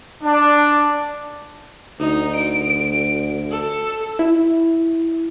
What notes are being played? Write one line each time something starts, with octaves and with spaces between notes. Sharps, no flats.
D4
D2 D#4
D7
A4
E4